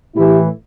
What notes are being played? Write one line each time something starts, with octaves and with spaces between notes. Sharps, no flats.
A2 E3 E4 G4